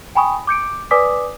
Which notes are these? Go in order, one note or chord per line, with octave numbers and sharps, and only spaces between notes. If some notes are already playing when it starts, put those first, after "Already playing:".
G5 G#5 B5 C#6 D#6
D6 G6 C#7 D7
B4 D5 G#5 D6 D#6 B6